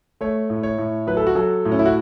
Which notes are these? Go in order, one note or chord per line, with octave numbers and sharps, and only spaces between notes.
A3 C#5
A2
C#5
A2
F#3 B4
A4
F#4
F#3 A4
A2
C#4
E4
F#4